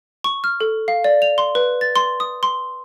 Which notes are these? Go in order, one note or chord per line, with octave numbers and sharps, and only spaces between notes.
C#6
F6
A4
F5
D5
F7
C6
B4
A6
C6
D#6
C6